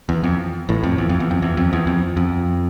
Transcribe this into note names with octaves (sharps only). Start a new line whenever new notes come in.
E2
F2
A1 A2
F2
E2
F2
E2
F2
E2
F2
E2
F2
F2